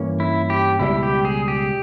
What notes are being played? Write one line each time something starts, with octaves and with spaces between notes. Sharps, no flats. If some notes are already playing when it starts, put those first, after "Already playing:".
Already playing: G2 E3 A#3 C#4
E4
G4
C#2 B2 G3 E4
G4
G#4
G4